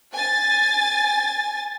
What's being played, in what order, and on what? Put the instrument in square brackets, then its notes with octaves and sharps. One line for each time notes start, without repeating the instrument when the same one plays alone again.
[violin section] G#5 A6